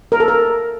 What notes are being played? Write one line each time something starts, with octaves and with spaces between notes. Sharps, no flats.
A#4
A4
A#4